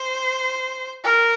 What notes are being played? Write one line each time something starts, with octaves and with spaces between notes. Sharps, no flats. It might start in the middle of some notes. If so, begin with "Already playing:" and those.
Already playing: C5
A#4